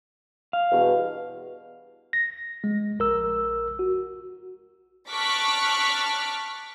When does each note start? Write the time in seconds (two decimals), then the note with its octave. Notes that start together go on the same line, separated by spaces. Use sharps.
0.53 F5
0.71 E2 G2 B2
2.13 A#6
2.64 G#3
2.99 A#1 A#4 E6
3.79 F#4
5.10 A5 C#6 D6 F6 F#6 B6